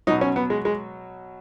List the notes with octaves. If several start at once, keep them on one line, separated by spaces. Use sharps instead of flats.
B2 F#3 D#4
C#4
B3
G#3
G#3